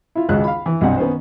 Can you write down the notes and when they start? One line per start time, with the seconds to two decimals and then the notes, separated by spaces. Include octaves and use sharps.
0.15 E4 F4
0.29 G#1 C#2 G#3 F#6
0.44 F5 B5
0.66 E3
0.81 B1 G2 C3 F#5
0.98 D#3 B3 C#4 C5